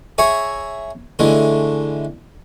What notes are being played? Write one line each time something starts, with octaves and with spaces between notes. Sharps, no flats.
G#4 C#5 E5 A#5 C#6
D3 E3 G#3 A3